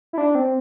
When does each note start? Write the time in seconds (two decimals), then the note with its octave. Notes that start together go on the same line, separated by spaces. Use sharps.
0.13 E4
0.18 D4
0.35 C4